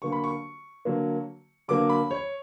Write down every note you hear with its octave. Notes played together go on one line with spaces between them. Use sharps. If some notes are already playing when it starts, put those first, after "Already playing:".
D3 F#3 A#3 C#6
B5
C#6
D3 F#3 A#3
D3 F#3 A#3 D6
B5
C#5